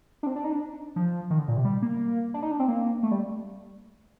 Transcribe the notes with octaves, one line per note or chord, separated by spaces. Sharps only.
D4
C4
D4
D#4
D4
F3
D#3
D3
A#2
C3
G3
A#3
D4
D#4
D4
C4
A#3
A3
G3